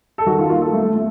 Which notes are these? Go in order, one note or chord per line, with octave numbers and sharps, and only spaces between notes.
A4
D#3 F#4
F4
A#3 F4
A4
A3
A3